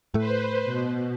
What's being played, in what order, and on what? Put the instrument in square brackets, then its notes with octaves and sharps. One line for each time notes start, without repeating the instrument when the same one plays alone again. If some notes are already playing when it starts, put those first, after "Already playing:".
[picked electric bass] A2 A3 [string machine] B4 C5
[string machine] B2